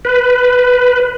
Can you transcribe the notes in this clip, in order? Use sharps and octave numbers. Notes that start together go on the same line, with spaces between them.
B4